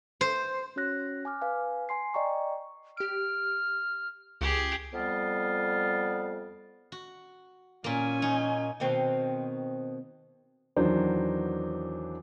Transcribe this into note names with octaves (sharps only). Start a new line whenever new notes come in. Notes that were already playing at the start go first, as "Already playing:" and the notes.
C5
C#4 F#4 C#5 F#6 A#6
G#5 D6 F6
B4 F5 G#5
G#5 C6 C7
D5 D#5 G5 A#5 C#6
G4 F6 D7
C#2 G4 G#4
F2 G3 B3 F4
F#4
A#2 A#3 C#4 G#5
D#4 C#5
B2 D#3 C4
E2 D#3 F#3 D4 C5